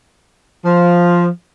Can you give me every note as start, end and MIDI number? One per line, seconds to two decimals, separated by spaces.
0.64 1.25 53